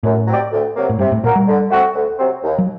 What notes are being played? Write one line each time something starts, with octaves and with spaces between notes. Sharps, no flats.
F#2 A2
F#3 C4 G4 D5
D2
C3 F#3 A#3
A2
G2 C3
A2
A#2 F#3 A#3 F#4 A#4
G3
D3
A3 C4 F#4
D2
C3 F#3 C4
D#2
F#3